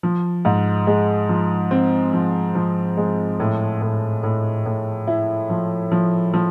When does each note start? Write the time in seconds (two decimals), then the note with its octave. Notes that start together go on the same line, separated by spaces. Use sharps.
0.03 F3
0.45 G#2
0.87 G#3
1.29 F3
1.71 C4
2.13 F3
2.55 F3
2.97 G#3
3.40 A2
3.81 A2
4.23 A2
4.66 A2
5.07 E4
5.50 F3
5.92 F3
6.34 F3